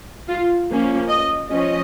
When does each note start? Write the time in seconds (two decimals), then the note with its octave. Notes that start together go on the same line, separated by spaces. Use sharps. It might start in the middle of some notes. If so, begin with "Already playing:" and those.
0.28 F4
0.69 F3 A#3 C#4
1.09 D#5
1.50 F3 C#4 D#5